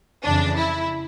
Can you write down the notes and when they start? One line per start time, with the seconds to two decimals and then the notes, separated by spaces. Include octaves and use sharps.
0.24 F2 C#3 E3 D4
0.57 E4